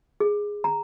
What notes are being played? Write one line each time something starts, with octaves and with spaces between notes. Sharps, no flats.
G#4
A#5